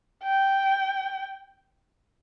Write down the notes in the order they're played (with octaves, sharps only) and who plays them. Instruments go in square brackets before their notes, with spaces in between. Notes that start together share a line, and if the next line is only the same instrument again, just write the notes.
[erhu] G5